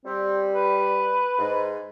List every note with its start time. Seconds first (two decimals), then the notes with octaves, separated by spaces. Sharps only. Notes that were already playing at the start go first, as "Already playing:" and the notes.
0.05 G3 C4
0.53 B4
1.39 G#2